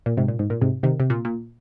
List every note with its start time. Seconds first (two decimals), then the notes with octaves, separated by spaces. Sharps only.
0.06 A#2
0.17 G#2 C3
0.28 A#2
0.39 G#2
0.50 A#2
0.62 G#2 C3
0.83 C3 D#3
1.00 C3
1.10 A#2
1.25 A#2